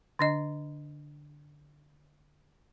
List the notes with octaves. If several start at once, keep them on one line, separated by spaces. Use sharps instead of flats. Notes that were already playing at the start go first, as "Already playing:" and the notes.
D3 D4 D#5